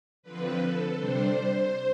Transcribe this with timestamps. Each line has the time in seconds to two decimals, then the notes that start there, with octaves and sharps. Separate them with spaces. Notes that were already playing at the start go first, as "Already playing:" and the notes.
0.23 D3 F3 C4 B4
0.59 A4
0.95 C3 G3 D4 C5